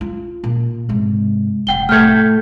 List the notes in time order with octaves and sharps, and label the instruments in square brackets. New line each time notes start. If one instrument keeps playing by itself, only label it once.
[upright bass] F4
A#2
G#2 C3
[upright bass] F1 C3 [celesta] F#5 G5 G7
[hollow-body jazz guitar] A2 A3 [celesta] F6 G6 G#6